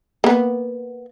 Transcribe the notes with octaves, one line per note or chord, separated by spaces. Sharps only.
A#3 B3